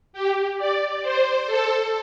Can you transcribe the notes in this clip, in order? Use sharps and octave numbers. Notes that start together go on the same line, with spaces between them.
G4
D5
C5
A4